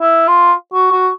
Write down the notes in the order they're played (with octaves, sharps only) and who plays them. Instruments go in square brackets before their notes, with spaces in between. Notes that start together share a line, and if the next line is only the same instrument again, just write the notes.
[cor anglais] E4
F4
F#4
F#4